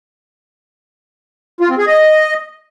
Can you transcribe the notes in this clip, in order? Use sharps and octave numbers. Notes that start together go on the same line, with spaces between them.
F4
C4
G#4
D#5